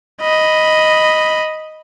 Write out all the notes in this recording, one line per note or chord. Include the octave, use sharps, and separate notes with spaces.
D#5 B5